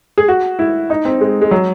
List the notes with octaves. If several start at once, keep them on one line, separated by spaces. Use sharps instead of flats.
G#4
F#4
E4
D#4
C4
G#3
G#3
F#3